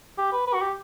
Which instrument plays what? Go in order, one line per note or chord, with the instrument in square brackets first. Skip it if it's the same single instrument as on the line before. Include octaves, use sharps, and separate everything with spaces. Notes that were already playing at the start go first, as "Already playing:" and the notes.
[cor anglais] G4
B4
B4
F#4
G4